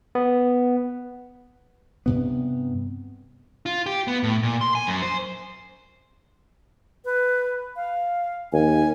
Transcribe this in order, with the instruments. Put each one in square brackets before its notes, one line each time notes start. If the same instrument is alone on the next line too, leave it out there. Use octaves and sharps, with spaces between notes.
[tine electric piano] B3
[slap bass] G2 C3 B3
[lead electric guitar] F4
G4
B3
A2
A#2
C6
G#5
F#2
C5
[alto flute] B4
F5
[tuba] D#2 [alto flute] G#5